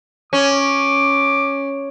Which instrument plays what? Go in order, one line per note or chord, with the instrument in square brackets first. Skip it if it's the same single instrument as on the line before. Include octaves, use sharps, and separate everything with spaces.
[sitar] C#4 [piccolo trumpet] D6